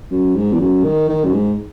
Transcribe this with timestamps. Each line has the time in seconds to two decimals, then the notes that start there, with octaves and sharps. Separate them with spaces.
0.11 F#2
0.36 G#2
0.52 E2
0.60 F#2
0.84 D#3
1.09 D#3
1.24 F#2
1.33 G#2